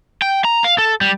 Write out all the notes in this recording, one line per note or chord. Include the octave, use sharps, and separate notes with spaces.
G5
A#5
F5
A4
G3